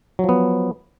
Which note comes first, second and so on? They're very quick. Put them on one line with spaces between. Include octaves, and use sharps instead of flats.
F#3 F3 B3